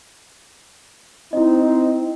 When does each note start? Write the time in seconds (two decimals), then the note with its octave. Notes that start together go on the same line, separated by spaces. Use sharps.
1.33 C4 D#4 E4 D#5